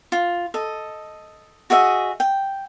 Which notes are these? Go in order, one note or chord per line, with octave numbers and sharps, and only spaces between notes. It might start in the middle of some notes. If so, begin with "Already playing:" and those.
F4
A4 D#5
F#4 G#4 D#5 E5
G5